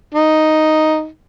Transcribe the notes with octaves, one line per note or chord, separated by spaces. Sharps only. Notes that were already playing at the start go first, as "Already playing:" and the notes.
D#4